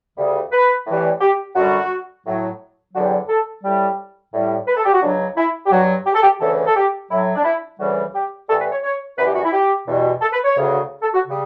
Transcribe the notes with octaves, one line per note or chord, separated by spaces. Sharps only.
D2 C#3 G3
B4
A2 E3 G3
G4
F#2 D3 G3 F#4
A2 F#3
E2 D3 F#3 F#4
G4
A4
A2 G3 G4
A2 G3
B4
A4
G4
F#4
C#2 C#3 F#3 D4
E4
G4
G2 F#3 F#4
G4
A4
G4
D2 C#3 E3 A4
A4
G4
A2 F#3 E4
D4
E4
D2 C#3 E3 G3 F#4
G4
A2 E3 G3 A4
B4
C#5
C#5
F#2 E3 G3 B4
G4
F#4
E4
G4
E2 B2 G3
A4
B4
C#5
D2 C#3 F#3
A4
F#4
C#3 G3